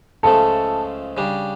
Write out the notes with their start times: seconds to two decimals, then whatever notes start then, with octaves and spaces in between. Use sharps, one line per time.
0.23 C#2 C#3 F3 A3 A4
1.17 C#3 G3 D4